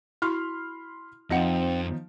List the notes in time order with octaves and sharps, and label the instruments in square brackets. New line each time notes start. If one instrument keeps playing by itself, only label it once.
[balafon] E4 F#4 [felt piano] B5 C6 F6
[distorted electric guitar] F2 [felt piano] F3 D#4 [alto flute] C4 [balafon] D#5 F#5